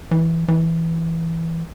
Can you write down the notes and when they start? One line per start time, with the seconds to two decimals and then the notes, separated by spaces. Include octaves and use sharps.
0.11 E3
0.48 E3